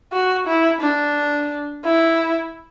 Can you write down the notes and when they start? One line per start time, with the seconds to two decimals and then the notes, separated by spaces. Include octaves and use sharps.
0.13 F#4
0.47 E4
0.81 D4
1.85 E4